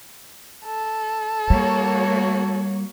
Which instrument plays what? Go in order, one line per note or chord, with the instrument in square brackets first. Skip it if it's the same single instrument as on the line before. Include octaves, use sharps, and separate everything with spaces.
[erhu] A4
[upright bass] G3 [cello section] A#3 F#4 C#5